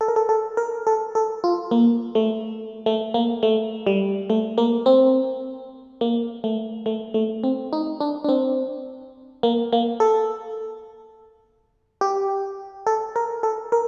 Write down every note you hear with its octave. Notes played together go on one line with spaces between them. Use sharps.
A4
A#4
A4
A4
A#4
A4
A4
F4
A#3
A3
A3
A#3
A3
G3
A3
A#3
C4
A#3
A3
A3
A3
C4
D#4
D4
D4
C4
A#3
A#3
A4
G4
A4
A#4
A4
A#4